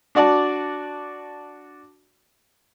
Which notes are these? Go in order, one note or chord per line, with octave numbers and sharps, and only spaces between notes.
D4 F#4 D5 A5